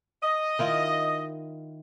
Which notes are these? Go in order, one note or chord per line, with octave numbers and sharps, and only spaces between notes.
D#5
D#3 E4 F4